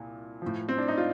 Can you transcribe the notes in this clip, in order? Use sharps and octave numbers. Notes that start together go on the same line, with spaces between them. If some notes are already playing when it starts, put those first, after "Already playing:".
Already playing: C2 A#2
A2 F3
C4
D4
D#4
F4